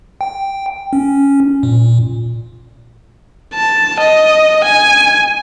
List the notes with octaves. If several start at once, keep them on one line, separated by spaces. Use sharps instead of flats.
G5
C#4
A#2
A5
D#5
G#5